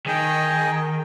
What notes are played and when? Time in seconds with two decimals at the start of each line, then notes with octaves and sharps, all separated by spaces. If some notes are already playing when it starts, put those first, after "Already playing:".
0.06 D#3 G#4 D#5 G5